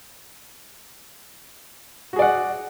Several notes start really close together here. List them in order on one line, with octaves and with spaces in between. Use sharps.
F#4 G#4 D5 F#5